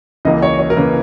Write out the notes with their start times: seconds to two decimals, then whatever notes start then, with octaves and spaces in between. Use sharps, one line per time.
0.25 C#2 C#3 E3 A#3 D#5
0.42 C#5
0.59 C#5
0.70 A#4
0.77 C#3 E3 A#3 B4